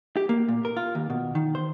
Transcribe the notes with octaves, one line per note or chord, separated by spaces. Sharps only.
G4
A#3
A#2
A#4
F4
D#2
B2
D#3
C5